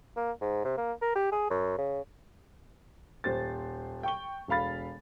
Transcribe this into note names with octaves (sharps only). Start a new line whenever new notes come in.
A#3
G#2
C3
A#3
A#4
G4
G#4
F#2
C#3
D#1 C5 A6
G5 C#6 G7
E1 A4 F5 B5 A6